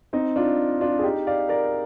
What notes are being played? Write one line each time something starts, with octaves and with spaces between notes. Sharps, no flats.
C4 D#4
D4 F4
D4 F4
G#4
D#4 G4
D5 F5
A#4 D5